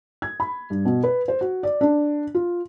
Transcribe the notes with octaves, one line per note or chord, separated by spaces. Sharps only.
G#6
B5
G2
B2
B4
C5
F#4
D5
D4
F4